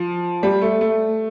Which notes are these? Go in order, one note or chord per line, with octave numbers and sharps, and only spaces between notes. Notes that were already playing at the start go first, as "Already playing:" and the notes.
Already playing: F3
G3
A3
A3